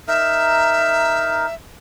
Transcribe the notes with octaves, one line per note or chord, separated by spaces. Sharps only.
D#4 A#4 E5